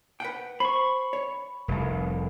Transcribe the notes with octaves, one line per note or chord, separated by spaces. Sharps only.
B4 F#5 G5
C5 B5 C#6
C#5
F1 C2